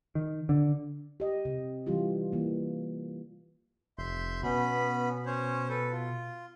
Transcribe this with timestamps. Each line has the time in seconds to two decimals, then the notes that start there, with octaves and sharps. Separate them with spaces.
0.15 D#3
0.49 D3
1.20 G4 D#5
1.45 C3
1.86 E3 G3 F4 G4
2.32 E3 A#3
3.98 F1 E5 C6 G6
4.43 B2 B3 C#4 B5
5.26 C#4 C5 C#5
5.69 A4 B4
5.91 F4